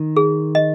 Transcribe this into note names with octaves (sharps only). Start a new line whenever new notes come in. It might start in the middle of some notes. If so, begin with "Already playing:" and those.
Already playing: D#3
G#4
D#5